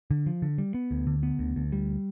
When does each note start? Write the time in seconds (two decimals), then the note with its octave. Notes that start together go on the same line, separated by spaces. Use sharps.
0.11 D3
0.26 F3
0.42 D3
0.58 G3
0.74 B3
0.91 D2
1.07 D3
1.23 B3
1.39 D2
1.56 D2
1.72 G3